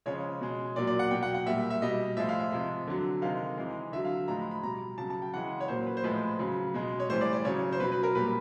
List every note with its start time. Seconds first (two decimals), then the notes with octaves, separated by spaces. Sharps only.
0.06 C#3 F3 G#3 C#5
0.41 B2 G#3
0.76 A#2 F#3 D5
0.87 D5
0.99 F#5
1.11 B2 F#3 G5
1.23 F#5
1.34 F#5
1.46 A#2 G3 E5
1.70 E5
1.82 B2 G3 D#5
2.17 A2 F3 G#3 E5
2.29 F5
2.40 E5
2.52 C3 F3 G#3
2.87 D3 F#3
3.22 C3 D#3 G#3 F5
3.57 C3 E3 G#3
3.92 D3 F#3 E5
4.04 F5
4.28 A2 F3 G#3 A#5
4.40 B5
4.51 B5
4.63 B2 G3 A#5
4.98 C#3 F#3 A5
5.10 A5
5.22 G5
5.34 C#3 E3 G#3 F#5
5.60 C#5
5.68 A#2 F#3 C5
5.87 B4
5.97 C5
6.04 A2 F3 G#3 B4
6.39 C#3 F#3
6.74 B2 G#3
7.00 C#5
7.09 A2 E3 G3 C5
7.21 D5
7.33 D5
7.45 C#3 F#3 C#5
7.73 C5
7.80 B2 F#3 B4
7.92 B4
8.03 A#4
8.15 A#2 G3 B4